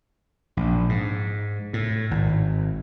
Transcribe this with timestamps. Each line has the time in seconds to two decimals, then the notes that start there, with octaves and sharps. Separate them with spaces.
0.57 A#1
0.89 G#2
1.73 A2
2.11 G#1